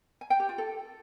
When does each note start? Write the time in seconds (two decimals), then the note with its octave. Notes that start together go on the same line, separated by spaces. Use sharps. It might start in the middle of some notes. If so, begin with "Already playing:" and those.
0.21 G#5
0.30 G5
0.40 G4
0.49 F4
0.58 A4